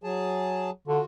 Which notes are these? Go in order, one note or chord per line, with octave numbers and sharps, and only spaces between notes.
F#3 G#4 A5
D3 F4 F#4